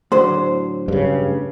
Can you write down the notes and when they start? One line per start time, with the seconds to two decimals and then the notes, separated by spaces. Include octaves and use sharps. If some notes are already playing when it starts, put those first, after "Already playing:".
0.12 A2 D3 F#3 C5
0.88 G2 C#3